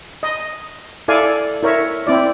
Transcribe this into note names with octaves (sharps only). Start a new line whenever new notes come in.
D#5
E4 A4 D5 F5 G#5
E4 A#4 C#5 E5
C4 E4 D5